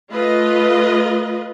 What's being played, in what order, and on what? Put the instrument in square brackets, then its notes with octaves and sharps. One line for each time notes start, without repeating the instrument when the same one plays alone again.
[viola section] A3 F4 B4 D#5